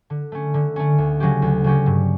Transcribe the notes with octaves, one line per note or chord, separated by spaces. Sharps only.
D3
A3 C#4
D3
A3 C#4
D2
C#3 F#3 C#4 G4
D2
C#3 F#3 C#4 G4
G2